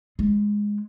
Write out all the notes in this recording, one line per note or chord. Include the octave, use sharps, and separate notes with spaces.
G#3